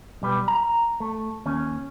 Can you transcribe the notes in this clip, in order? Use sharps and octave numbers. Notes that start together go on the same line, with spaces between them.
B1 G3 B4
A#5
A3
D#2 C#4